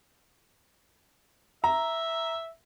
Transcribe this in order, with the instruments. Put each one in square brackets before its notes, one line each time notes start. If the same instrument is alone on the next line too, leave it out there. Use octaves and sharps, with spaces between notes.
[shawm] E5 [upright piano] A#5